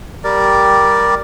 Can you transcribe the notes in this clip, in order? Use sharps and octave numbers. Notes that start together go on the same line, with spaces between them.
G3 G4 A#4 D5